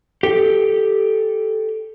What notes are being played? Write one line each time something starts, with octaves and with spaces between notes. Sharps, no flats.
G4 A4